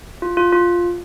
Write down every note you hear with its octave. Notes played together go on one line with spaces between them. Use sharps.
F4
F4
F4